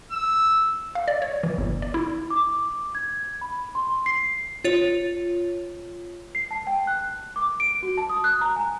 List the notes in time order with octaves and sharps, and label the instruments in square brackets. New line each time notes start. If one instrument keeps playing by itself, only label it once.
[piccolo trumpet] E6
[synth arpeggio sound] F5
D5
C#5
E3
G1
D5
E4
[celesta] D6
G#6
B5
C6
C7
[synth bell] F4 C#5
[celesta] C7
A5
G5
F#6
D6
D7
F#4
A5
D#6
F#6
A#5
G#5